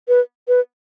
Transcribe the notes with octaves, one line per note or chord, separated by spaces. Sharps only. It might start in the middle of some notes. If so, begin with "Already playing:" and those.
B4
B4